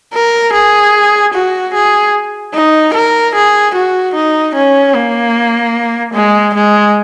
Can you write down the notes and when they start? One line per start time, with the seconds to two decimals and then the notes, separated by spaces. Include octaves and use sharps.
0.14 A#4
0.53 G#4
1.34 F#4
1.74 G#4
2.54 D#4
2.94 A#4
3.35 G#4
3.75 F#4
4.14 D#4
4.55 C#4
4.94 A#3
6.14 G#3
6.55 G#3